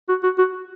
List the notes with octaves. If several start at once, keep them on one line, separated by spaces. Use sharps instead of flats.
F#4
F#4
F#4